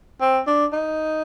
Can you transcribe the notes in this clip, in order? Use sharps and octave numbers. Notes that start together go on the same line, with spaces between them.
C4
D4
D#4